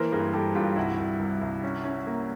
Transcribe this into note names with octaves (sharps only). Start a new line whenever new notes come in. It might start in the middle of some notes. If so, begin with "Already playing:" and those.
Already playing: E3 A#3 A#4 C5
G2 G#4 A#4
G3 G4 A4
G2 F4 G4
C2 E4 F#4
C2
C2
C2
C#4
C#4
A#3